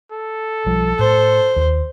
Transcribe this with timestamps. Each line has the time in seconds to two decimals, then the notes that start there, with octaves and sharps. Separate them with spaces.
0.12 A4
0.66 B1 F3 G3
0.99 A2 C5
1.56 D#2